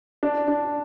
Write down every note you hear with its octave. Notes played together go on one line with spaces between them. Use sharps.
D4
D4